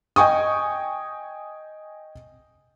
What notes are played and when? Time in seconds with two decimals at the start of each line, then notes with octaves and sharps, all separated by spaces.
0.16 D#5 G5 G#5 C#6 D#6